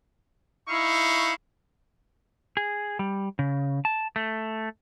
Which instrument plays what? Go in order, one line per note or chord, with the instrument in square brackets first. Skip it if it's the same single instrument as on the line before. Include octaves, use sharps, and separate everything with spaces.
[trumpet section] D#4 E4 F5 C#6
[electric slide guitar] G#4
G3
C#3
A5
A3